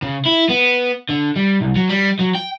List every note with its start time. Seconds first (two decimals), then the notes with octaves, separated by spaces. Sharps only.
0.02 C#3
0.25 E4
0.49 B3
1.09 D3
1.36 G3
1.61 C2
1.76 F#3
1.89 G3
2.19 F#3
2.35 G5